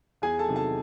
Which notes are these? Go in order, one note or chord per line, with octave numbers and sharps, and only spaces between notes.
E2 G#4 G#5
A4 A5
C3 D#3 F#3
A4 A5